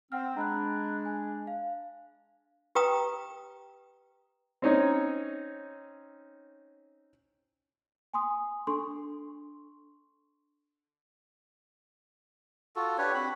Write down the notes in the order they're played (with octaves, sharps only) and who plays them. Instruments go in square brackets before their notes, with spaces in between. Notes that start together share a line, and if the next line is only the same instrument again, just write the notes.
[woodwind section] C4 [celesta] F#5 G5 F6
[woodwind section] G#3 D4 [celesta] A#5 B5 F#6
[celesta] G#5
F5
[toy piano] G4 B4 G5 A#5 D#6
[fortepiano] C4 C#4 D#4 C#5
[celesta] G#5 C6 D#6
D4 A4 C6 C#6
[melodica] F4 F#4 A4
D4 G4 B4 C#5
C4 F#4 B5